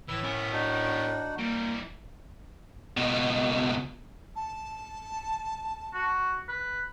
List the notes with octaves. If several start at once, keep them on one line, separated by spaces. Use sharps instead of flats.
A2 E3 B4 E6
B3 C#4 A#4 E5
D4 D#4 F#4
E3 G3 A#3
C#2 B2
A5
F#4
B4